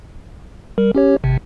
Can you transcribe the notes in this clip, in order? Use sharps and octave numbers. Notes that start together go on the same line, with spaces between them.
G3 A#4
C#4 G4 C#5
G#1 C3